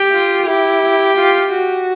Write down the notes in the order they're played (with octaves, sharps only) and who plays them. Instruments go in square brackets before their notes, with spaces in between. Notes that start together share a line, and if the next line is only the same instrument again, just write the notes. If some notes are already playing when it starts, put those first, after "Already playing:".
Already playing: [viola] G4
[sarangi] F4
[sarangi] E4 [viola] G4
[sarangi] F4
F#4